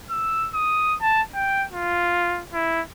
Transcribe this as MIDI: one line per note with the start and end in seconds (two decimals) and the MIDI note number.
0.10 0.49 88
0.54 0.96 87
1.02 1.22 81
1.35 1.66 79
1.72 2.43 65
2.53 2.82 64